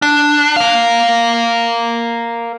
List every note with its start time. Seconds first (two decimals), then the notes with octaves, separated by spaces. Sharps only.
0.02 D4
0.56 A#4 F5